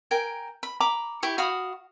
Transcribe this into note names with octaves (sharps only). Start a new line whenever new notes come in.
A#4 G5 G#5
B5
A#5 B5 D6
E4 G4 C#6
F#4 F5 B5 D#6